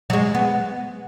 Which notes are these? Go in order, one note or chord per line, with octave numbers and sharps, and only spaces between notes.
F#3
G#3
B3